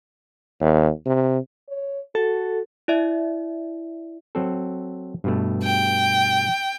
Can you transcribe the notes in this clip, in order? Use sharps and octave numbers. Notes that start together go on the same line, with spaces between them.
D#2
C3
C#5
F#4 A4
E4 D5 E5
F#3 C4 A4
G2 B2 A3
G5